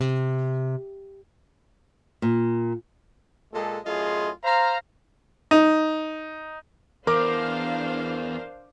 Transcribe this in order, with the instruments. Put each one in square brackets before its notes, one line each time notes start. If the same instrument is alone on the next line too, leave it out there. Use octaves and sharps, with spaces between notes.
[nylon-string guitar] C3
A#2
[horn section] A#2 G#3 A4
F#2 A2 F4 G#4 D#5 C6
C5 F5 A#5
[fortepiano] D#4
[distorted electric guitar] E2 [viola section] D4 C5 F5 [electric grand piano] A#4 [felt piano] D6